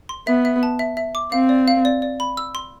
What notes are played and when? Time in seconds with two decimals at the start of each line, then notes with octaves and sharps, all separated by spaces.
0.09 C6
0.27 B3 E5
0.45 E5
0.63 A5
0.79 E5
0.97 E5
1.15 D6
1.32 C4 F5
1.49 D5
1.68 F5
1.85 D5
2.02 D5
2.20 B5
2.37 E6
2.55 C6